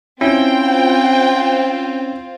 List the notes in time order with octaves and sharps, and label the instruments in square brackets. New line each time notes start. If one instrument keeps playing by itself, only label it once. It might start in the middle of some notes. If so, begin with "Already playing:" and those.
[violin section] C4 F4 [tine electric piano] C#4 [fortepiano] E4 [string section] G5